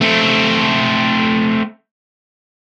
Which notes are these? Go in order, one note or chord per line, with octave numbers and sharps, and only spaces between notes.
A3 C4